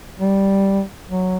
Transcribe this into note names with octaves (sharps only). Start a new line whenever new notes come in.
G3
F#3